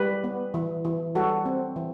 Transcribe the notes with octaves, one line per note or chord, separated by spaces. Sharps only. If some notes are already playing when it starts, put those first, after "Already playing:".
Already playing: G3 G4 B4
B3
E3
E3
G3 F#4 A4
C4
E3